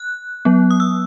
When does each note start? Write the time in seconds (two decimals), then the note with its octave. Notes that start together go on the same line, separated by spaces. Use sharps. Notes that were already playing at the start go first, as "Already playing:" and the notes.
Already playing: F#6
0.45 F#3 B3
0.71 D#6
0.80 E6